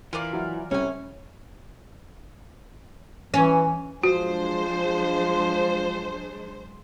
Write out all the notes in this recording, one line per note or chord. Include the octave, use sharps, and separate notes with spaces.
E3 F4 A#4 D5
F#3 E4
C2 C3 C#4 C#5 G#5
E3 C#4
F3 F#3 G#3 D4 F#4 C5